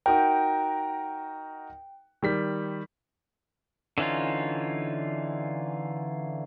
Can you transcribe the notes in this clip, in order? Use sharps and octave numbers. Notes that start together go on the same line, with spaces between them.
D#4 F#4 A#4 G5
D#3 G3 B6
D3 E3 C#4 D#4 F4